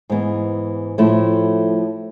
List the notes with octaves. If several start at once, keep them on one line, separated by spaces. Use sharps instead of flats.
G#2 E3 B3
A2 F3 A3 E4